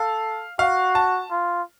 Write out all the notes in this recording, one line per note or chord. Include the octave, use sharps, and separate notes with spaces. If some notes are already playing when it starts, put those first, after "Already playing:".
Already playing: A4 F5
F#4 F5
A5
F4